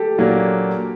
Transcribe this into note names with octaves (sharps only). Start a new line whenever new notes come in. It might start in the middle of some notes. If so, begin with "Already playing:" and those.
Already playing: G4 A4
A#2 F#3 A#3 D4